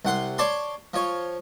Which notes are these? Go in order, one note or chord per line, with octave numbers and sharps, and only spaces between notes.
C2 F#5 C6
C#5 D5 A5 C6
F3 C#5